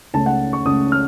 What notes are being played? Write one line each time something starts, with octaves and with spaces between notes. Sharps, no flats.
C#2 C#3 A3 C#4 A5
F#5
C#6
C#2 C#3 A3 C#4 D#6
F6